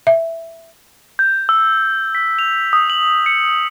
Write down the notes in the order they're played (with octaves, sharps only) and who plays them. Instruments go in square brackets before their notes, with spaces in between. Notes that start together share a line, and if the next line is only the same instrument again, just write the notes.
[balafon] E5
[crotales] G6
E6
B6
F7
D#6
F#7
C#7